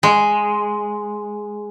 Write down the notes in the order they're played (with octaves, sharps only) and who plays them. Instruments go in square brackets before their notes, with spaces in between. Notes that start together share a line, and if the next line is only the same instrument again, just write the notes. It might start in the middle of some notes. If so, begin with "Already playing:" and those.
[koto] G#3